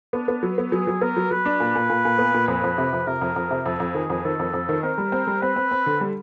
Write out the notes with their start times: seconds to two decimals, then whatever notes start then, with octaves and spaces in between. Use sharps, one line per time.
0.13 B3 D4
0.28 B3
0.43 F#3
0.58 B3
0.72 F#3 G#4
0.87 F#3
1.01 B3 A#4
1.17 F#3
1.31 F#3 B4
1.45 D4
1.60 A#2
1.75 A#2
1.90 A#2
2.05 A#2
2.18 B3
2.34 A#2
2.48 F2 B4
2.64 F2
2.78 C3
2.93 F2
3.07 C3 A#4
3.22 F2
3.36 F2
3.51 C3
3.66 F2 A4
3.80 F2
3.95 D#3 G#4
4.10 F2
4.24 D#3 A4
4.39 F2
4.53 F2
4.69 D#3
4.83 C4 A#4
4.98 G3
5.12 C4
5.27 G3
5.41 C4 B4
5.56 C4
5.71 C4
5.86 D3
6.01 G3